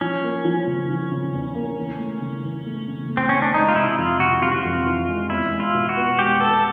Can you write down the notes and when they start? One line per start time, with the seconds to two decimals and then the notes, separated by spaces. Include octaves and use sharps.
0.01 F3 C#4
0.24 A#3
0.45 F3
0.67 C#3
0.90 F3
1.11 C#3
1.34 E2
1.55 A#3
1.78 E3
1.99 A3
2.22 C#3
2.44 E3
2.66 A3
2.88 C#3
3.09 A3
3.17 C4
3.29 A3 C#4
3.42 D4
3.54 G#3 D#4
3.68 F4
3.76 C3 E4
3.98 F2 F4
4.20 C3 F#4
4.42 C3 F4
4.52 F#4
4.62 F2 F4
4.86 E3
5.08 G#3
5.30 E2 E4
5.52 G#3
5.60 F4
5.74 B2
5.89 F#4
5.97 B3
6.19 G#3 G4
6.40 B3 A4